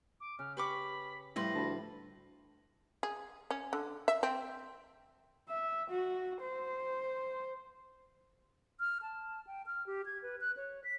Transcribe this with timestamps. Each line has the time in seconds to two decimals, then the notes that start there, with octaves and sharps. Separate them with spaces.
0.21 D6
0.39 C#3 F6
0.57 G4 B4 B5 C#6 D6
1.36 A2 F3 G3 E4 B4 C6 A#6
1.55 D2 A5 B5
3.03 G#4
3.51 C#4
3.73 D3
4.08 E5
4.23 C4
5.48 E5
5.90 F#4
6.42 C5
8.80 F6
9.02 A5
9.47 G5
9.66 F6
9.87 G4
10.06 G#6
10.22 B4
10.41 F#6
10.57 C#5
10.84 B6